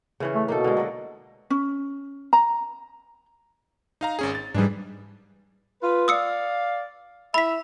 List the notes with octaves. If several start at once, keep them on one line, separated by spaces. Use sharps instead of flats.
C#3 E3 C#4
A3
B2 A#3 D#4 A4
D3 G#3
F#3 D5 D#5
C#4
A#5
D#4 F5 A#5
G#1 C#4 G#4
A6
G#2 E3 G3 D4 G#4
F4 B4
D5 F5 D#6 E6 C#7
E4 E5 B5 B6